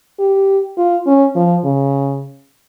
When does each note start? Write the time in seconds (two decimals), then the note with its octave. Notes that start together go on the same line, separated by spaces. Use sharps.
0.20 G4
0.78 F4
1.07 C#4
1.35 F3
1.64 C#3